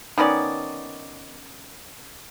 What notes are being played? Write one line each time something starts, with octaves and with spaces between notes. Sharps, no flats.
D#3 B3 C#4 D5